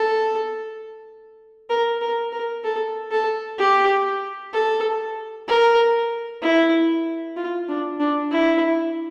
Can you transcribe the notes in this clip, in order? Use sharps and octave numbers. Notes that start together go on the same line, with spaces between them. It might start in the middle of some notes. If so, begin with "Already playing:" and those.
Already playing: A4
A#4
A#4
A#4
A4
A4
G4
A4
A#4
E4
F4
D4
D4
E4